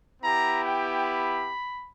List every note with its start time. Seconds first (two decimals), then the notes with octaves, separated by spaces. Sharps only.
0.22 B3 E4 G4 A#5
0.63 G5
1.04 B5